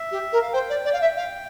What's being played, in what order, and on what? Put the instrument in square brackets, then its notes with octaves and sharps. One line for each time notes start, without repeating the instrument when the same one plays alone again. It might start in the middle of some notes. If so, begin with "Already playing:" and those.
Already playing: [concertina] E5
[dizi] G4
A#4
[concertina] F5
[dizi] C5 [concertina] G5
[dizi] D5
D5
F5
E5
F5